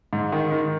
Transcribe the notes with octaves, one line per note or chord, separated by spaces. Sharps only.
G#2
D#3
D#3